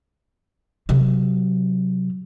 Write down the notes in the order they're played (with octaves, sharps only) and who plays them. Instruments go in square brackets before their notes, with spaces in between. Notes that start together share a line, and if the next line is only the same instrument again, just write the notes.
[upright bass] C3 F#3